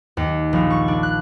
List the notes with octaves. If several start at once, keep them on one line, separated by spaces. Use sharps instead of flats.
D#2
A#1
C#6
D4
F#6